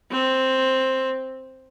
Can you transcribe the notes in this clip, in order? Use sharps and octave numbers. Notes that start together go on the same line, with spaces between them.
C4